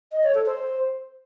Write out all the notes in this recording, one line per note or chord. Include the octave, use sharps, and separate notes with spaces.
D#5
C#5
A4
C5